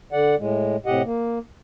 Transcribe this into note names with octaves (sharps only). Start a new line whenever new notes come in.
D3 D5 F#5
A2 G#3
A2 C3 G4 D#5 F#5
A#3